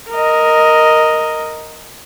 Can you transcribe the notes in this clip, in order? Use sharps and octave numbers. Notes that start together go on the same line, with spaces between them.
A#4 D#5